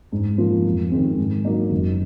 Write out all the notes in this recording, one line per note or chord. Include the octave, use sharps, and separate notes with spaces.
G#2
F3 A#3
F2
D#3 G#3 C4
G#2
F#3 A#3 D#4
F#1